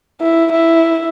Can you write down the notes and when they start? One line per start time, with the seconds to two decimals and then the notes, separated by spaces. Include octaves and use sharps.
0.21 E4
0.52 E4